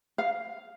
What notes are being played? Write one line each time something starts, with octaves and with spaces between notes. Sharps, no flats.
F5